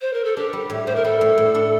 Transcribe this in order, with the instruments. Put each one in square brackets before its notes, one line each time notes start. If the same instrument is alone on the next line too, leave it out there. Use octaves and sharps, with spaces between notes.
[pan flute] C5
A#4
A4
[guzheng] D4 [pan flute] G4
[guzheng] G3
A2
[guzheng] A2 [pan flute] C5
[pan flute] A#4
[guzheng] G3 [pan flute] A4
[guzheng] A2
A2
D4